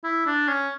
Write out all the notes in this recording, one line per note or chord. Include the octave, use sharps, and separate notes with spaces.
E4
D4
C#4